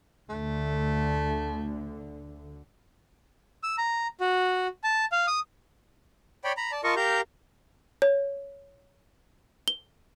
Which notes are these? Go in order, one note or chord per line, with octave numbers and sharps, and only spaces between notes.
D2 D3 A3
E6
A#5
F#4
A5
F5
D#6
C#5 D5 G5 B5
A#5 B5
D5 A5
F4 A#4 D#5 A5 C#6
G4 A#4 F5 A#5 G6
C#5
G7